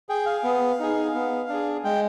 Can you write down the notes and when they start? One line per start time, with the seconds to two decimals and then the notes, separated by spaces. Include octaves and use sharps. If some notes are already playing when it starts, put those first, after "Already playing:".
0.09 G#4 G5
0.26 F5
0.44 B3
0.80 D#4 G#4
1.14 B3
1.49 D4 G#4
1.84 G#3 G5